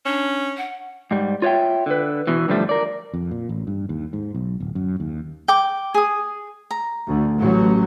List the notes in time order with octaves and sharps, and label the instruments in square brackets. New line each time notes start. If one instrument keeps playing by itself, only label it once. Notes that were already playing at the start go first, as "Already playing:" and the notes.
[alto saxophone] C#4 [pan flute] D4
[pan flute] F#5
[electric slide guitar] G#2 G3
F4 C#5 D5 E5 G5
D3 B4
E2 B2 E3
G2 D3 F3 G3 A3
A#4 D5
[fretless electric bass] F2
A#2
A1
G2
D#2
G#2
B1
D1
F#2
D#2
[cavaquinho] G5 D6
G#4 D#6
A#5
[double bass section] D2
A1 F#3